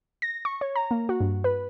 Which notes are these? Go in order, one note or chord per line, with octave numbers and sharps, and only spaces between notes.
A#6
C#6
C#5
A#5
A#3
F#4
G2
B4